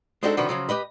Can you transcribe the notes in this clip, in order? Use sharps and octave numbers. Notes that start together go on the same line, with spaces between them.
G#3 C4 D4 D#4 F#4 A4
C3 D#3 F3 D4 F#4 B4
C#3 F3 F#3
G4 B4 D#5 B5